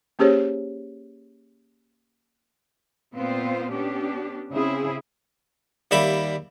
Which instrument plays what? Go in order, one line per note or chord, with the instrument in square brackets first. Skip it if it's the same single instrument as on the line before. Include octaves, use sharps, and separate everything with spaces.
[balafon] A#3 C#4 G4 G#4 C5 C#5
[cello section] A#2 B3 C4 F4 C5
B3 C#4 D4 G4
C#3 C4 C#4 E4 G#4
[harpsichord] D#2 G3 E5 B5 D6